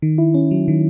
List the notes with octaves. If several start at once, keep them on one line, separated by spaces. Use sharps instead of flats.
D#3
E4
C#4
F#3
D#3